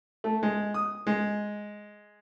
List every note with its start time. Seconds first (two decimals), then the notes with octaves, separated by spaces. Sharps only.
0.24 A3
0.43 G#3
0.74 D#6
1.07 G#3